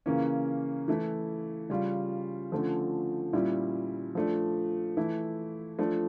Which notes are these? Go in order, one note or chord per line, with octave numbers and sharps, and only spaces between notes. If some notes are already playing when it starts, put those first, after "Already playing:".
C#3 E3 A#3 C#4
E3 A3 E4
C#3 G3 C#4 F4
D3 F3 A3 C#4
A#2 G3 C#4 E4
F3 A3 D4
E3 A3 E4
F3 A3 D4